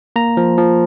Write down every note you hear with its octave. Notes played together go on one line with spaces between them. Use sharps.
A#3 A#5
F3
F3